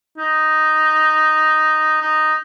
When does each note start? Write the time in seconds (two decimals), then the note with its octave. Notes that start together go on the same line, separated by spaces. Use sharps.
0.18 D#4
2.01 D#4